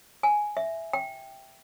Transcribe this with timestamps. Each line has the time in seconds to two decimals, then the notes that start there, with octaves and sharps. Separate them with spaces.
0.23 G#5
0.57 E5
0.93 G5